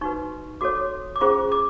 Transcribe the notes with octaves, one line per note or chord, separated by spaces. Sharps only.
D#4 F#4 B4 C#6
F#4 A4 C#5 D6
D6
C#4 F4 G#4 C5 C#6
D6